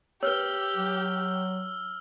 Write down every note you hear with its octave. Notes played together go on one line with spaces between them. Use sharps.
G4 B4 C#5 E6 F6 G7
F#3